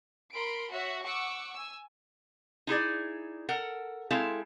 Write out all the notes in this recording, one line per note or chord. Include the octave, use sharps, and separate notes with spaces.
A#4 B5 C6 D7
F#4 C#5 E5 F#5
F#5 C#6 D6 E6
G#5 E6
D#4 E4 G#4 D5
A4 A#4 F#5
G#3 C4 E4 A4 F5